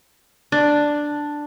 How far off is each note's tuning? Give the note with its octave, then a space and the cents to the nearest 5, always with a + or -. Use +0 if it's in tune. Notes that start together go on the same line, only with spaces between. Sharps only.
D4 +5